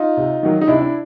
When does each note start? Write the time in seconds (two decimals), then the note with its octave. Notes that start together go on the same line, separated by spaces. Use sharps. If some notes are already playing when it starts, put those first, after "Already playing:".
Already playing: D#4 F4
0.17 C3
0.43 D#3 F#3
0.61 D#4
0.68 C3 D4 E4
0.82 D4